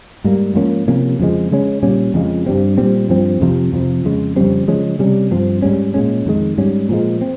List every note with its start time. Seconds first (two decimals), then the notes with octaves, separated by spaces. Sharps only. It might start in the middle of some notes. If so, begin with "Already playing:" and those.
0.24 G#2 G3 A#3
0.55 G#2 F3 A#3 C#4
0.88 C3 F3 A#3 C#4
1.20 F2 C#3 F3 G#3
1.51 C#3 G#3 C#4
1.83 A#2 G3 C#4
2.14 F2 C#3 F3 G#3
2.46 G2 G3 C4
2.78 A#2 G3 C4
3.09 G2 F3 C4
3.41 F2 C3 F3
3.73 F2 C3 F3
4.05 F2 C#3 G#3
4.36 F2 C#3 G3 C4
4.68 C#3 F3 G#3 C#4
4.99 C3 G3 C#4
5.31 G2 F3 C4
5.62 G#2 G3 C#4
5.94 A#2 G#3 C#4
6.26 F2 D#3 G#3
6.58 G#2 G3 C#4
6.89 A#2 F3 G#3
7.21 C4